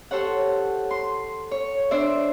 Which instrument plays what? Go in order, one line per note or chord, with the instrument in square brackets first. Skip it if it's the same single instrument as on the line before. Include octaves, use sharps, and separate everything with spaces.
[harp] G4 A4 C5 C#5 F#5
C6
C#5
D4 C5 D5 E5